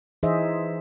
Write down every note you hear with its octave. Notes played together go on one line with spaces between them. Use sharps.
E3 D#4 G#4 C5 D#5 E5